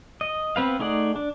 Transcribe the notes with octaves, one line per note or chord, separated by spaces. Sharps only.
D#5
B3 C4 B4 F5
A3 D#4 G#4 D5 F#5
D4